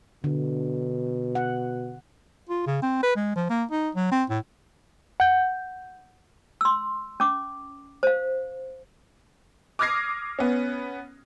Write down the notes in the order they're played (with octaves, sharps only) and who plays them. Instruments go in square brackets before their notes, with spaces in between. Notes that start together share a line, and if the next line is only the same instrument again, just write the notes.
[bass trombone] B2 [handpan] D3
[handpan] F#5
[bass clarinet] F4
C#3
C4
B4
G#3
F3
A#3
D#4
F#3
C4
A2
[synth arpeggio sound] F#5 G6
[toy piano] C6 E6
C#4 D6
C5 F5
[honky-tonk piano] D6 D#6 F6 G#6 A#6 C7
B3 C#4